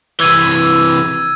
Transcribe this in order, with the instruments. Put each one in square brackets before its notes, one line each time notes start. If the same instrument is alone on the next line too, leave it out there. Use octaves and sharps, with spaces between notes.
[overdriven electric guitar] C3 E3 [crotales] E6 G#6 D#7